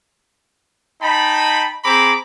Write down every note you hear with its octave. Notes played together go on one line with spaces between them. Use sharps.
D#4 G5 A5 B5
C4 G#4 A#5 B5 D6